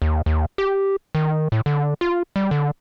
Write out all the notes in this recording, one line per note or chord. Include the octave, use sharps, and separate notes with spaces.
D#2
D#2
G4
D#3
A2
D3
F4
G3
D3